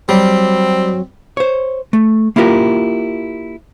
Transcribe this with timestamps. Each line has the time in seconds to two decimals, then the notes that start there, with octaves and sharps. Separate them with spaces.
0.09 F#3 G3 C4
1.37 C5 C#5
1.93 A3
2.36 A#3 E4 F4 G4 A#4